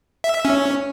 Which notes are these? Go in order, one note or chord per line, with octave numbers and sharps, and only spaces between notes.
E5
E5
C#4